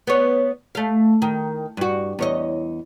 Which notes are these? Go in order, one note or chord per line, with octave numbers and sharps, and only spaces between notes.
B3 C#5
A3 F5
D#3
G2 F#4
E2 C#5 D#5